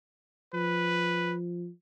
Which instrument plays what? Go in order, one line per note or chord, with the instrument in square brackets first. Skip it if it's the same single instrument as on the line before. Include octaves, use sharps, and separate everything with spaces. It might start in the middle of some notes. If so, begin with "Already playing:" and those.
[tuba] F3 [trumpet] B4